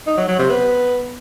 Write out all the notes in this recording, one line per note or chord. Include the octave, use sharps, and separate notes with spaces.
D#4
F#3
F#3
C3
B3